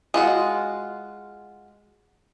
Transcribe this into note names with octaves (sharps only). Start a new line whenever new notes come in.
G#3 F4 F#4